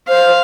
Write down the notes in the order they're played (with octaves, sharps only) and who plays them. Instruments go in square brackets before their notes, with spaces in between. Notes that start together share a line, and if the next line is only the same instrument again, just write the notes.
[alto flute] C5 [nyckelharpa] F5